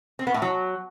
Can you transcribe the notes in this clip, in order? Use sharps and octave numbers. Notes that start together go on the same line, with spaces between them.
C4
B3
A2
F#3